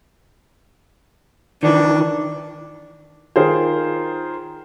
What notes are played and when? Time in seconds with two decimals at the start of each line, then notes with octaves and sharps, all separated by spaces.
1.63 D#3 E3 D4
3.36 D#3 F4 G#4 A#4 C5